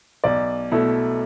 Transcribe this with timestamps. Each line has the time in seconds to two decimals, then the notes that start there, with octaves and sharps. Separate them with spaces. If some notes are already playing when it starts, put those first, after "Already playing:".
0.24 B1 D5
0.72 B2 A3 E4